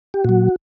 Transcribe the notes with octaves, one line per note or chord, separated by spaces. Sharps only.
G4
A#2 F#3 F#4